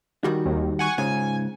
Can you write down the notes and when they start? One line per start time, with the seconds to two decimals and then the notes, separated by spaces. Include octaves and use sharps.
0.24 D#3 G3 F#4
0.46 D#2
0.79 F#5 G#5 C#6
0.98 G#2 C#3 F4 G#5